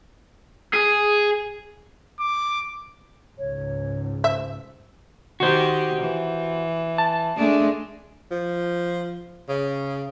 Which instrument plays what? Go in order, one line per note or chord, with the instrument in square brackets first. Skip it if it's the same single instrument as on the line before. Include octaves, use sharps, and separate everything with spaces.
[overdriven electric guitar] G#4
[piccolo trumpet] D6
[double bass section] C#2 G#2 [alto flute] C#5
[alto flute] C5 [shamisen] E5
[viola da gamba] D#3 G4 [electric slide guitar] F#4 C5
[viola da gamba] E3
[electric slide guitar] A5
[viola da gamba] G#3 A3 D4
[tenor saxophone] F3
C#3